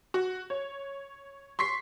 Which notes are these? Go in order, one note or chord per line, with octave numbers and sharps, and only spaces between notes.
F#4
C#5
C6 C#6 B6 C7